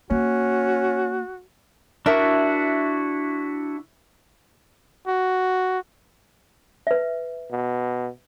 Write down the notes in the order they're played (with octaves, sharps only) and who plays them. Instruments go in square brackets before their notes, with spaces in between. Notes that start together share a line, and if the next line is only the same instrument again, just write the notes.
[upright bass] A#3 [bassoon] C#4 [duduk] F#4
[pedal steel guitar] D4 E4 F#4 [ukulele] A#4 E5
[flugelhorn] F#4
[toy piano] B4 E5
[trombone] B2